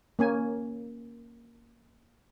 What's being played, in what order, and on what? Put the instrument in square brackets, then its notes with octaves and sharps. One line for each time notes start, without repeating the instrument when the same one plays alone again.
[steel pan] A#3 C#4 G#5